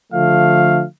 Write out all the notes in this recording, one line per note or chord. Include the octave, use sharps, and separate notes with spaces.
D3 F3 A3 F5